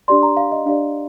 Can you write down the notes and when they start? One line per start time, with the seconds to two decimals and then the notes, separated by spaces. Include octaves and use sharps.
0.08 D4 G4 D5 C6
0.23 A#5
0.37 F5
0.52 D#5
0.66 D4 G4 D5 F5